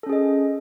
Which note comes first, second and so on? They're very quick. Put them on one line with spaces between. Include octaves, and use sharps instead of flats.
A4 C#4 G#4 D#5